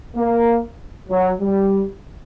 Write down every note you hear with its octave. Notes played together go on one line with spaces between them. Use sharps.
A#3
F#3
G3